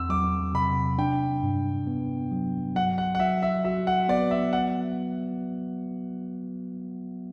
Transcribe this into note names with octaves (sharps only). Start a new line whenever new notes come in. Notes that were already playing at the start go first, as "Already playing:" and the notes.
Already playing: E2 C4 E6
F#3 D6
C3 B5
D4 G5
G2
B3
F#3
F#3 F#5
F#5
F#5
F#3 E5
E5
F#4 E5
F#5
B3 D5
E5
F#5